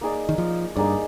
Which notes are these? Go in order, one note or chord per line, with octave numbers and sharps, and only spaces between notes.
A#3 D#4 G#4 D5
D#3
F3
G2 A#3 D#4 G#4 D5